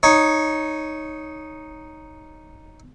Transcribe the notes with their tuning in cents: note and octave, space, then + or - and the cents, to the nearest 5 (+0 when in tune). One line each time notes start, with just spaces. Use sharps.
D#4 +0 C#5 +0